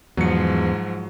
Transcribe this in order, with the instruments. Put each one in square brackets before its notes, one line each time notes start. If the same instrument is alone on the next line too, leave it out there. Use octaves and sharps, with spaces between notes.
[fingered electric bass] E2 [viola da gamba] G#2 F3 [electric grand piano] F#3 C#7